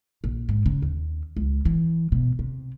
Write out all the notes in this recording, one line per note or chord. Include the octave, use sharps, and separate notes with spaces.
A#1
G#2
C#3
D#2
C#2
E3
B2
C3